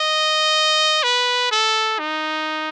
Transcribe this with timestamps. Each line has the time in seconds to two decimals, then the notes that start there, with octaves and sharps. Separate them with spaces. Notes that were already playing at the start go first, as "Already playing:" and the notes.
Already playing: D#5
1.03 B4
1.51 A4
1.99 D#4